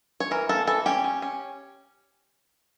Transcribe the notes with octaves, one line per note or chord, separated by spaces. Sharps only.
C#5
E3 A#4
A#3 A4
E3 A4
C#4 G4
C#4
C#4